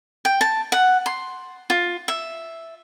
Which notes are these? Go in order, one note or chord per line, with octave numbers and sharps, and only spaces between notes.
G5
A5
F#5
C6
F4
E5